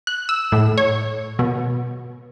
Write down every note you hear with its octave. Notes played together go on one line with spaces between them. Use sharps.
F#6
E6
A2
C#5
B2